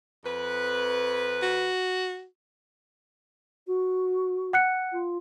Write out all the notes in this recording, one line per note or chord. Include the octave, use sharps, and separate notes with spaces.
F2 B4
F#4
F#4
F#5 F#6 C#7
F4